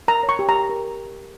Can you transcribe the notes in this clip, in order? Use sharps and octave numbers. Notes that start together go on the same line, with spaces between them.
A#4 A#5
C#5
C#6
G4
A#5
A#4
A#4